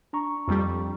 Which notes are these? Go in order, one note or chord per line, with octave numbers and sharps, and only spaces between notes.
D4 A#5 C#6
F2 G3